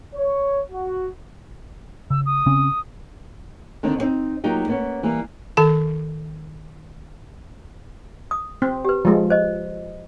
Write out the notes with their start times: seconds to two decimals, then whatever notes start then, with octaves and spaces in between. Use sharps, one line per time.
0.14 C#5
0.72 F#4
2.10 C#3 E6
2.26 D#6
2.46 C#3 C4 C#4
3.83 D3 D#3 A#3 C4 D#4
3.99 B3 C4 D#4
4.44 F#3 A#3 D#4 F4 G4
4.68 A#3 B3 C#4
5.03 E3 G3 A#3
5.57 D#3 A4 A5
8.31 D#6
8.62 C4
8.85 G4 B4
9.05 F3 G#3
9.30 C5 D#5